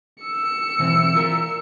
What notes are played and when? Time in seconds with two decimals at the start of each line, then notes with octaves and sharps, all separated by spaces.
0.23 E6 C#7
0.79 B1 E3 C4
1.15 F4 A#4